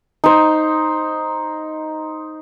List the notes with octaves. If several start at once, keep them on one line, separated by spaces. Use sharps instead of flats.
D#4 C5